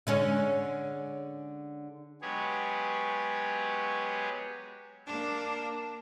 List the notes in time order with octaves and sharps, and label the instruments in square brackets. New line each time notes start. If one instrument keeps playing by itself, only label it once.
[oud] D3 G#3 C#4
[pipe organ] F#3 G#3 B3 G4 G#4 C#5
[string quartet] A#3 D4